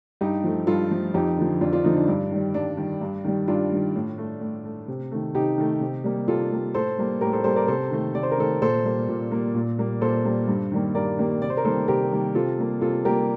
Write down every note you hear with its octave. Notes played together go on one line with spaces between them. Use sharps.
G2 D#4 G4
F3 A3
G2 F4 A4
F3 A3
F2 D#4 G4
D3 F3
F2 D4 F4
D4 F4
D3 F3 D#4
D4
G2 D4
D#3 G3
G2 D4
D#3 G3
G2
D#3 G3
G2 D4 F4
D#3 G3
A2
A3
A2
A3
C3
D#3 A3
C3 D#4 G4
D#3 A3
C3
G3 A#3
C3 F4 A4
G3 A#3
A2 A4 C5
G3 A#3
A2 G4 A#4
A4 C5
G3 A#3 A4 C5
A#4 D5
C3 A4 C5
D#3 A3
C3 D5
C5
A#4
D#3 A3 A4 C5
A#2 A4 C5
G3 A#3
A#2
G3 A#3
A#2
G3 A#3
A#2 A4 C5
G3 A#3
G2
D#3 G3 A#3
G2 A#4 D5
D#3 G3 A#3
C3 D5
C5
A#4
D#3 G3 A#3 A4 C5
C3 G4 A#4
D#3 G3 A#3
C3 F4 A4
G3 A#3
C3 F4 A4
G3 A#3 G4 A#4